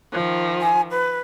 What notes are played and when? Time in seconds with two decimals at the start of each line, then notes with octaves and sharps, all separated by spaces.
0.13 D#3 F3
0.62 G#5
0.91 B4